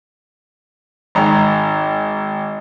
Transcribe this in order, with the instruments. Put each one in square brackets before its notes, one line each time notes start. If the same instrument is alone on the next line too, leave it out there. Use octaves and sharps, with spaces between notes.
[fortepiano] G#1 A#5